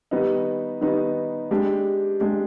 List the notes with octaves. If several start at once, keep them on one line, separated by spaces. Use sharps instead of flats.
D#3 G3 B3 D#4
D#3 G3 B3 D#4
G#3 D4 G4
G#3 D4 G4